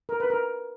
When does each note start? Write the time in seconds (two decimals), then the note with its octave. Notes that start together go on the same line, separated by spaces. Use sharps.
0.09 A#4
0.20 B4
0.30 A#4